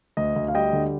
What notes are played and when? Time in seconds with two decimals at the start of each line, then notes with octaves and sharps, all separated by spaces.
0.17 D2 D#5
0.36 D2
0.48 F5
0.55 G3 D#5 G5
0.73 D3